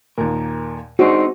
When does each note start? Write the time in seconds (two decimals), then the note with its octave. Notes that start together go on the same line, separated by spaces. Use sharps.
0.18 D#2 A#2 A#4
0.99 G#3 C4 D4 D#4 F#4 C5